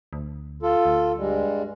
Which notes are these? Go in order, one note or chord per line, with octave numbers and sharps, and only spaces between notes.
D2
F4 A4
D2
G2 G3 G#3